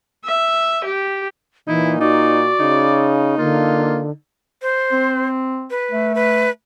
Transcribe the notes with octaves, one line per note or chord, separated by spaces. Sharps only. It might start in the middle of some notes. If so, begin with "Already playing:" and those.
E5
G4
A#2 E3 D#4 E4
D#4 F#4 D5
C#3 D#4
D3 A#3 F4
C5
C4
B4
A3
B4